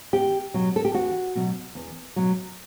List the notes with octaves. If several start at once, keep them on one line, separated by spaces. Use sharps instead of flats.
E2 G4
B2 F#3
A4
G4
E2 F#4
B2 F#3
E2
B2 F#3